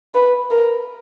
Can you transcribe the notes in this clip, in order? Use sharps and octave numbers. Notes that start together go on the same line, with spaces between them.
B4
A#4